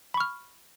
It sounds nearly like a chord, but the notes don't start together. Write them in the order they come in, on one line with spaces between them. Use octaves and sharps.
B5 C#6 F6